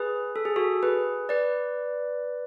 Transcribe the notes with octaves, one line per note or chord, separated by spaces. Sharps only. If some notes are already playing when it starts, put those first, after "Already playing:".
Already playing: G#4 B4
A4
G#4
F#4 A4
G#4 B4
B4 D5